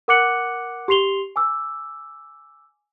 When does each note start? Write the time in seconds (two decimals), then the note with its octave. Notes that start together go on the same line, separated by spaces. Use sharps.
0.08 A#4 F#5 D6 F#6 C#7 F#7
0.88 G4 C6 C7 F7 G7
1.36 G#5 D6 E6